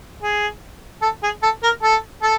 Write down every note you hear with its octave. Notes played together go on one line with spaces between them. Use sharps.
G#4
A4
G#4
A4
A#4
A4
A4